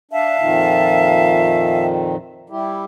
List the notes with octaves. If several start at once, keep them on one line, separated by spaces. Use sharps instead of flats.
D4 E5 F5 A5
F2 A#2 D#3
G3 E4 G4